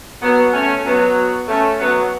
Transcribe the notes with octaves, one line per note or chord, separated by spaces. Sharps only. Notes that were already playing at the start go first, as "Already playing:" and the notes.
F#3 B3
A3 C#4
F#3 B3
A3 C#4
F#3 B3